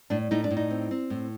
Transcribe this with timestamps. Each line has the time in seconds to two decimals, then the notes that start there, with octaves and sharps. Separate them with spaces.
0.10 A2 D4
0.31 A2 D#4
0.44 D4
0.51 A2
0.57 D#4
0.71 C4
0.91 C4
1.10 A2